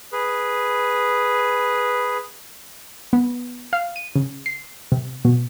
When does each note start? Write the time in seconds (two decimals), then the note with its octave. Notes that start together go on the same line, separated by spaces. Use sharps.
0.12 G#4 B4
3.13 B3
3.73 F5
3.96 D#7
4.16 C#3
4.46 C7
4.92 C3
5.25 B2